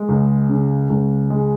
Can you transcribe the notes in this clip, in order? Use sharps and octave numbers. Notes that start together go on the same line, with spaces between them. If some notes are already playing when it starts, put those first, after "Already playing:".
Already playing: G#3
C#2
C#3
C#2
G#3